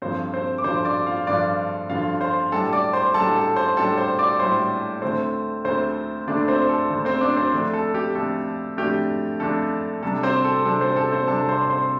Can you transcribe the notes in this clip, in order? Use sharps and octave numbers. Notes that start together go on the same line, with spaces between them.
G2 D3 F3 C4 C5
C4 C5
D6
G2 D3 F3 C5 C6
D5 D6
F4 F5
G2 D3 F3 D4 D5
G2 D3 F3 F4 F5
C5 C6
A2 G3 D4 A4 A5
D5 D6
C5 C6
A2 G3 D4 A4 A5
A4 A5
C5 C6
A2 G3 D4 A4 A5
C5 C6
D5 D6
A2 G3 D4 C5 C6
D2 D3 A3 C4 C5
D2 D3 A3 C4 C5
D2 D3 A3 D4 D5
C4 C5
A4
D2 D3 A3
C4 C5
D4 D5
C4 C5
F2 D3 A3 D4
A4
G4
F2 D3 A3 D4 A4
F2 D3 A3 D4 G4
F2 D3 A3 D4 A4
C3 G3 D4 A4
C4 C5
A4
C3 G3 D4 A4
C4 C5
A4
C4 C5
C3 G3 D4 A4 A5
C5 C6
C5 C6